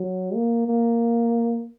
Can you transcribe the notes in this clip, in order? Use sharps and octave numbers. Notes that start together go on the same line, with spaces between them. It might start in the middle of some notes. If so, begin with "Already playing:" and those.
Already playing: F#3
A#3
A#3